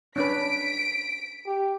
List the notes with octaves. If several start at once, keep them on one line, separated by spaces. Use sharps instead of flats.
C#4 D4 B4 B6 D7
G4